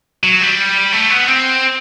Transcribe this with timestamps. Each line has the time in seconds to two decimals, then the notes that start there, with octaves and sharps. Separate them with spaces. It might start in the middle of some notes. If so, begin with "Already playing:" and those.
0.24 F#3
0.41 G3
0.93 A3
1.11 B3
1.28 C4